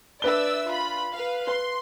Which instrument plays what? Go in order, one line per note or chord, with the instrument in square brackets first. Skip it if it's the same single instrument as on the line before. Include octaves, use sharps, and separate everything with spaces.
[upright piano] D4 B4 G7 [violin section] D5 E5 E6
[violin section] F4 B5
B4 F5
[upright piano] B4 [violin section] C6